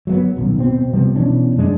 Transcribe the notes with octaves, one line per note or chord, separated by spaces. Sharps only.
F#3 A3 B3
D#1 B1
B2 C4
C3 F3 G3 B3
B2 E3 C#4 D4
F1 F#2 G#3 D4